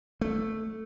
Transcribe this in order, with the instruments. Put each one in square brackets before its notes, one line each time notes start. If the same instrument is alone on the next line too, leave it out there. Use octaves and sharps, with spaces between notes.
[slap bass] A3